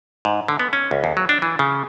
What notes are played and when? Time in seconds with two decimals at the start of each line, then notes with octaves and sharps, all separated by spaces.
0.25 G#2
0.48 D3
0.59 B3
0.73 C#4
0.91 C#2
1.04 D#2
1.17 F#3
1.29 D4
1.42 E3
1.59 C#3